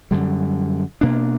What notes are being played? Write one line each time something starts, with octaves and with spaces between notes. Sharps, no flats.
F#2 D3 G3
B2 A#3 D4